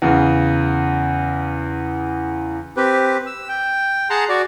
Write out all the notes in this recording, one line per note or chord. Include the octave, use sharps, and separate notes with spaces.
E2 C#3
C4 G4 B4
E6
G5
G#4 F#5 A5 A#5 C6
F#4 D5